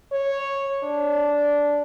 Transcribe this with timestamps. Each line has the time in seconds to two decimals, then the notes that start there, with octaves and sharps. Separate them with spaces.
0.12 C#5
0.84 D4